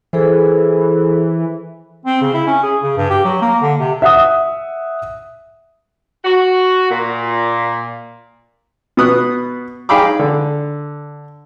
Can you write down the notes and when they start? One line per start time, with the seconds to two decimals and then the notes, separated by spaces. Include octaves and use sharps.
0.13 E3 G#4 A4 C5
2.06 C4
2.21 C#3
2.34 E4
2.47 C#4
2.63 G#4
2.83 C#3
2.97 G2
3.10 G4
3.25 F#3
3.42 A#3
3.62 D3
3.80 C3
4.02 E5 F#5 D#6
6.25 F#4
6.89 A#2
8.97 B2 B3 D#6 F#6
9.89 D#4 G#4 F5 G5 B5 D6
10.19 D3